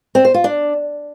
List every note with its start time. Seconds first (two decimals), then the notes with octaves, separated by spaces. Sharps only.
0.15 C4
0.25 C5
0.34 F4
0.44 D4